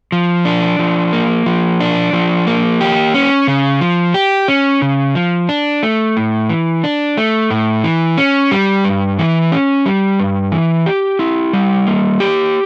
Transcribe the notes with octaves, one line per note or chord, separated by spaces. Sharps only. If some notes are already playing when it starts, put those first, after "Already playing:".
F3
D4
F3
A#3
F3
D4
F3
A#3
G4
C#4
C#3
F3
G4
C#4
C#3
F3
D4
A3
A2
E3
D4
A3
A2
E3
C#4
G3
G2
E3
C#4
G3
G2
E3
G4
E4
G3
A#3
G4